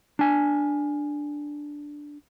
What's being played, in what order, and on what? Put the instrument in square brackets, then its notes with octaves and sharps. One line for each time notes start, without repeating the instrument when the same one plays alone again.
[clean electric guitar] D4 G#5